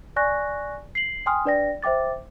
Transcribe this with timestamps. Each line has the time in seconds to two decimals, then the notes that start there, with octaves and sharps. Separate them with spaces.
0.16 D5 G#5 C#6 F#6 A#6
0.95 C7 F#7
1.26 G5 G#5 C6 D#6 F6
1.45 D4 B4 D5 G5 A#6
1.83 C5 E5 G5 D6 A6